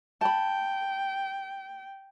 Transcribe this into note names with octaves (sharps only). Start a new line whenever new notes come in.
G5 A5 B5